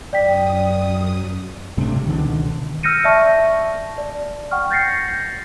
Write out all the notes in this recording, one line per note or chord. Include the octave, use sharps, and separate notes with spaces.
F#2 D5 G5 D#6 B6
D1 G2 C3 A3 D4
D3
C#2 B2 D3 D#3
E6 F6 G6 A#6 C#7 D#7
D5 E5 A5 C#6 A#6
D5
F#5 G5 C#6 F6
G6 A6 A#6 C7 C#7